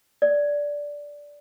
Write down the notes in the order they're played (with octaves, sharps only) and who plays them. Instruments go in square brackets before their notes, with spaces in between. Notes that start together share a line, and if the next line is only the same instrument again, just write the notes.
[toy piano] D5